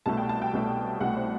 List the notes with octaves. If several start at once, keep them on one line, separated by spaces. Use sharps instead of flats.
C2 B2 A3 A5
G5
A5
G5
C2 B2 A3
C2 B2 A3 F#5
C5